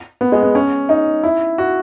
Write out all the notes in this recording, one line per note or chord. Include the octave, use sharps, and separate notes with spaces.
B3
G#3
B3
C#4
D#4
E4
F#4